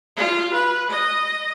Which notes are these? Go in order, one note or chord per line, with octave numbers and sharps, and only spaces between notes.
F4
B4
D#5